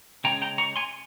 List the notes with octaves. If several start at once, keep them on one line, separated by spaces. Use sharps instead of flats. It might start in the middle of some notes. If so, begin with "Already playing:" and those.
C#3 G#3 C#4 G5 A#5
G5 A#5
A#5 C#6
G#5 C6